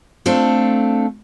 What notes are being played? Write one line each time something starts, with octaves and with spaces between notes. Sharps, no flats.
A3 C4 D4 F4 A4